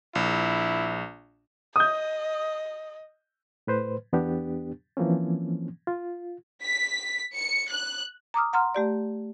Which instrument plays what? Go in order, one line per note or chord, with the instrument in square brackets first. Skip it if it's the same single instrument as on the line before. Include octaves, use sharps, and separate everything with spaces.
[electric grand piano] A#1 [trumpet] E4
[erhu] D#5 [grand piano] D#6 G6
[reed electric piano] A2 B4 C5
E2 B3 D4 G4
E3 F3 A#3 C4 C#4
F4
[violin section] B6
C#7
F#6
[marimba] A#5 D6 D#6 F6
F#5 A#5 C6 F6
A3 G4 D5